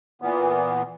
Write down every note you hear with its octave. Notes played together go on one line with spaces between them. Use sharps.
A#2 E3 B3